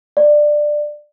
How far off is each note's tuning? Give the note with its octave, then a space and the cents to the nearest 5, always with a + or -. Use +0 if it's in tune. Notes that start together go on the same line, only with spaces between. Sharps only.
D5 +15